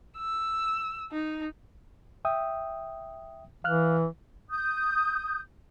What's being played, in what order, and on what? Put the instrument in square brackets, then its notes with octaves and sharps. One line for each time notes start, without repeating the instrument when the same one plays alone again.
[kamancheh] E6
D#4
[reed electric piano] E5 G5 D#6
[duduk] E3 [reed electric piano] F5 F6 F#6
[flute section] D#6 G6